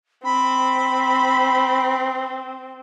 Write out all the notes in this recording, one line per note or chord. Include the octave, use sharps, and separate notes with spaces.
C4 B5